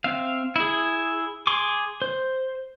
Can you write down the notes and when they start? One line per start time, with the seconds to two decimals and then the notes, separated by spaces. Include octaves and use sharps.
0.04 C4 E5 F5
0.56 E4 G#4
1.47 G#4 C6 D6
2.02 C5